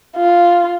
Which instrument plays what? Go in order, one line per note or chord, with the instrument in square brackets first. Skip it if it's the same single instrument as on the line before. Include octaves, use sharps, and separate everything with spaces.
[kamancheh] F4